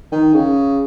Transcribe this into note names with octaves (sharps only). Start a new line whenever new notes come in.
D#3
C#3